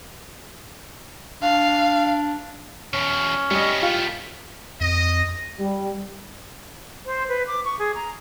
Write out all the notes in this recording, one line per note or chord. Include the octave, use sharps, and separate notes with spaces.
D4 F5
E2 B2 C#4
G3 A3 B3 D#5
F4 G4 F5
F2 D#5
G3
C5
B4
D6
C#6
G#4
A#5